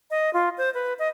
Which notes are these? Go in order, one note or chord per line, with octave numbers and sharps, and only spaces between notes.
D#5
F4
C5
B4
D#5